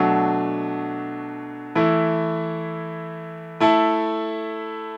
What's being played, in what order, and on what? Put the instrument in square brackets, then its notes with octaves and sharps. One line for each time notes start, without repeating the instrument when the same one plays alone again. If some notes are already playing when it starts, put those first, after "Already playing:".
Already playing: [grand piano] B2 F#3 A3 D4
E3 A3 E4
A3 E4 A4